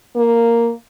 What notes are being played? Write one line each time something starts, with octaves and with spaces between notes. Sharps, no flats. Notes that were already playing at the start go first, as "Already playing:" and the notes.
A#3